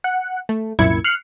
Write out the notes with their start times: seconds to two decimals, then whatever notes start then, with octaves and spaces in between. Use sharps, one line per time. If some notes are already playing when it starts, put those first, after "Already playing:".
0.04 F#5
0.49 A3
0.79 C2 F#2 A#2 E4 G#6 C#7
1.04 F6 F#6 C7 C#7